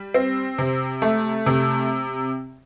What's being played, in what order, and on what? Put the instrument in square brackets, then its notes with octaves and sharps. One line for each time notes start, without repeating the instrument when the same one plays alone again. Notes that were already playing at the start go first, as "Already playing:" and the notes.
Already playing: [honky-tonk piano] G3
C4
C3
A3
C3